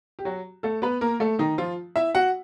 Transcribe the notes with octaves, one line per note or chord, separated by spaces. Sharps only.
G4
F#3 F#4
A3 A4
B3 B4
A#3 A#4
A3 A4
D#3 D#4
F3 F4
E4 E5
F#4 F#5